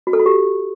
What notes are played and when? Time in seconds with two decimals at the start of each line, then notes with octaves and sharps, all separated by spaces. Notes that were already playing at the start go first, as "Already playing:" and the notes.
0.07 F#4
0.13 A4
0.20 F#4
0.26 G4